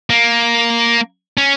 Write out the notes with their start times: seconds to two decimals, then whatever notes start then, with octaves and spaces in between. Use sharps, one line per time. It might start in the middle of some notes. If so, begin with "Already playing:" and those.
0.10 A#3
1.37 C#4